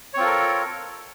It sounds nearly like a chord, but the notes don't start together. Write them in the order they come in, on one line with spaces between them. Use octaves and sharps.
C#5 C4 F4 A4 A#4